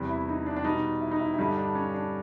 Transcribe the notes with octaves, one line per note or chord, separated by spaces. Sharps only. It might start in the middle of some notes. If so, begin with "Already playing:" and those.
Already playing: E2 C3 E3 G3
E4
D#4
D4
D4
B2 G3 D#4
E4
D#4
E4
E4
G2 D3 G3 D#4
D4
C#4
D4